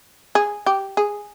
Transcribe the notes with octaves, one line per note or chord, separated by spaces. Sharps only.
G#4
G4
G#4